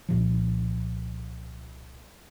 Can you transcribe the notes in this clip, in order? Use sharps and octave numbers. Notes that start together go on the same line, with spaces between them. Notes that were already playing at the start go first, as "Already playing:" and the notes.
C2 A#2 F3